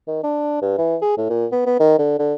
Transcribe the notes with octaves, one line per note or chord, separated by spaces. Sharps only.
D#3
D4
G2
E3
G#4
A2
A#2
B3
B3
D#3
D3
D3